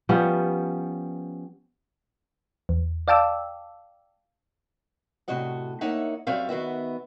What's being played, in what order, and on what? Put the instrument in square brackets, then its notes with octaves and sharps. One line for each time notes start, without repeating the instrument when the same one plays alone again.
[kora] F3 G3 B3 C#4
[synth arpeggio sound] E2
D5 F5 G5 A5 D6 E6
[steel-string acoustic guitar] A2 C3 F#4 D#5 F#5
A#3 D#4 C#5 E5 F#5
F#2 G3 C4 F#4 E5 F5
D#3 B3 F#4 E5